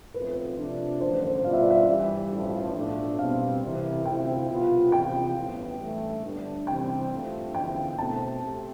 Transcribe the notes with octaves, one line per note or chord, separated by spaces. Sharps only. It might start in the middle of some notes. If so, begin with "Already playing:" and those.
B1 A2 F3 C4 B4
C3 F3 A3 D4
A1 G2 D3 C5
C5
B2 G3 B3 D4 F4 F5
E5
D5
E5
G2 E3 G3
A1 G2 F3
B1 A2 F3 A3 D4
B2 G3 C4 F5
C2 C3 E3
D2 C3 F3 C4 E4 G5
C2 B2 B3 F4
E2 C3 F3 C4 F4 G5
A1 G2 E3 B3
A1 G2 E3 A3
G1 G2 D3 A3 D4
C3 E3 G3 C4 G5
G2 F3 A3 D4
E2 D3 F3 B3 E4 G5
B2 A3 C4 A5
A3 C4 G4